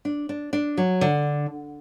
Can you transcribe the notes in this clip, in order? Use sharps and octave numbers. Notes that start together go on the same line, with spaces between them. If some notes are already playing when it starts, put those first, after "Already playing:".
D4
D4
D4
F#3
D3